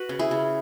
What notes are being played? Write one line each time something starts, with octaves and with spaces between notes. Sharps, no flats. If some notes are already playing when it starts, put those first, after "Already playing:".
Already playing: F#4 B4
C#3
E4 G#4
C#3